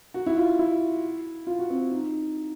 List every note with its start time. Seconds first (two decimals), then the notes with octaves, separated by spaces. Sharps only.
0.14 F#4
0.26 E4
0.36 F4
0.59 E4
1.47 F4
1.59 F#4
1.70 C4
1.91 D#4